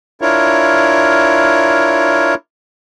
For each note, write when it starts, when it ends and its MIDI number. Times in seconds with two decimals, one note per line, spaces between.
0.22 2.34 62
0.22 2.34 64
0.22 2.34 65
0.22 2.34 70
0.22 2.34 73